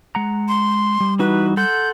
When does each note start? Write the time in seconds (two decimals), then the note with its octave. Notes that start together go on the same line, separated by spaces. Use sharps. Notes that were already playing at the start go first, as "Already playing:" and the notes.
0.15 G#3 F#5 A#5
0.48 C6
1.00 G3
1.19 E3 D#4 F#4 B4
1.57 A4 F#5 C6 G6